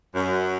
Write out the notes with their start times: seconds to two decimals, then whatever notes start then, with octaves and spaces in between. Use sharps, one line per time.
0.15 F#2